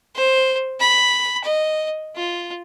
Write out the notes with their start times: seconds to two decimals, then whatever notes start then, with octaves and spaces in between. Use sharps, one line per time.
0.16 C5
0.80 B5
1.44 D#5
2.16 F4